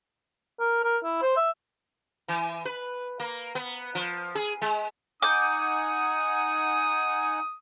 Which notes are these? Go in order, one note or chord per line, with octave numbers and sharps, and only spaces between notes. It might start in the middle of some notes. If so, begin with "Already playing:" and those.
A#4
A#4
E4
C5
E5
E3
B4
A#3
B3
F3
G#4
G#3
D#4 F#5 G#5 D6 D#6 G6